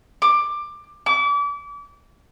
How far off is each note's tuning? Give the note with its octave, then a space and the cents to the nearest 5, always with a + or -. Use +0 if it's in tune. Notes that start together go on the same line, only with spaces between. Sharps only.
D6 +15
D6 -35